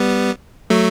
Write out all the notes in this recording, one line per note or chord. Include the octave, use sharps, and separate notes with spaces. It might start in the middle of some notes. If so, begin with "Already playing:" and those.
Already playing: G3 B3
F#3 A3